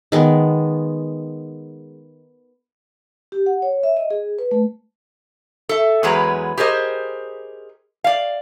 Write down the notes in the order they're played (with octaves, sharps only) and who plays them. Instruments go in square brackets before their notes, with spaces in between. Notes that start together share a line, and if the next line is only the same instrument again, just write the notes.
[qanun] D#3 G#3 B3
[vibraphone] G4
F#5
C#5
E5
D#5
G#4
B4
A3
[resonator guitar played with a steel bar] A4 E5
E2 F#3 G#3 G#4 B4 A#5
G4 G#4 A#4 C5 D#5
D5 F5